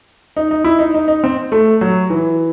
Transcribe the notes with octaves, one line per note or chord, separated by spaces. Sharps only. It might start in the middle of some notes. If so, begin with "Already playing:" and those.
D#4
D#4
E4
D#4
D#4
D#4
C4
A3
F#3
E3